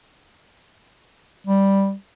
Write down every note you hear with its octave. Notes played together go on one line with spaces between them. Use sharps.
G3